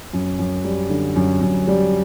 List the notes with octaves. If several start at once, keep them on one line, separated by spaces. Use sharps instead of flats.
F#2
F#2
G3
D3
F#2
F#2
G3